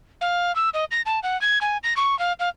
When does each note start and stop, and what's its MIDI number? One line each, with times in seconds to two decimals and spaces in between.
0.21 0.54 77
0.55 0.69 88
0.74 0.85 75
0.91 1.01 94
1.06 1.19 81
1.23 1.39 78
1.41 1.59 92
1.61 1.77 80
1.83 1.94 94
1.97 2.18 85
2.19 2.33 77
2.39 2.49 77